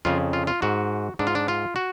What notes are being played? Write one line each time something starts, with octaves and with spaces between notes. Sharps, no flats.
F2 C#3 F4
F4
F4
G#2 F#4
G#2 D4
F4
D4
F4
F#4